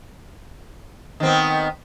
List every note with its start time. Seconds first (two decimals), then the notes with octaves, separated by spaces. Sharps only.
1.20 D#3
1.23 C4
1.26 B3